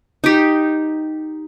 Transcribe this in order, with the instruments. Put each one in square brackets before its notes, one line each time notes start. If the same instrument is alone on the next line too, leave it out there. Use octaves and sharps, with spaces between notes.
[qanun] D#4 G4